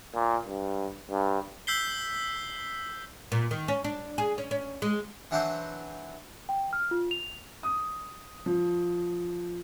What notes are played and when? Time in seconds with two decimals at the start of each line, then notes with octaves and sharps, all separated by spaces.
0.15 A#2
0.47 G2
1.11 G2
1.67 E6 G6 B6 C7 G7
3.32 A#2
3.51 D#3
3.68 C#4
3.85 D4
4.18 G#4
4.38 C#4
4.51 C#4
4.82 G#3
5.31 E3 F#3 D4 E4 F#4 C5
6.49 G5
6.73 F6
6.91 F4
7.11 F7
7.63 D#6
8.46 F3